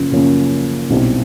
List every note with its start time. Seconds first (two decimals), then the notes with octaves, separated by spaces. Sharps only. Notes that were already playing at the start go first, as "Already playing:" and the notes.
Already playing: F#2 C#3 F3 A#3 C#4
0.12 F#2 C#3 F3 A#3 C#4
0.90 B1 A#2 G3 C4 E4